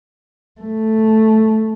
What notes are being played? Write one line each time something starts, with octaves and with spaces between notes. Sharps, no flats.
A3